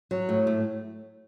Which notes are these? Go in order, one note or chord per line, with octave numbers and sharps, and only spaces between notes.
F#3
A2
A3